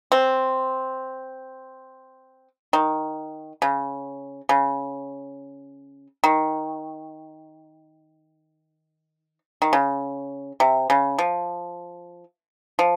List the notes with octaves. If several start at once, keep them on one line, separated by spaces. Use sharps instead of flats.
C4
D#3
C#3
C#3
D#3
D#3
C#3
C3
C#3
F3
F3